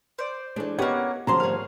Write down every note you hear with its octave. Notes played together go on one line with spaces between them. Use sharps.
C5 D5
E3 G#3 A3 D4
A#3 B3 C#4 G4 B4 D#5 F#5 G#6
D2 C#3 F3 F#3 C5 A5 A#5 C6
G#1 G3 G#4 C#5 F5